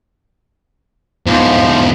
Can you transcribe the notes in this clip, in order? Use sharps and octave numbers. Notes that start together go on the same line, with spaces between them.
E2 G#2 F3